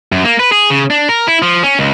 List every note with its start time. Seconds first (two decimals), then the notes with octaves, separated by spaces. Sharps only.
0.12 F#2
0.24 A#3
0.39 B4
0.52 G#4
0.70 C#3
0.90 D4
1.09 A#4
1.27 E4
1.42 F3
1.63 C#4
1.79 C#2